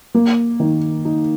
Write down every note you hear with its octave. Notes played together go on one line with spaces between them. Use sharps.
A#3
D#3
D#4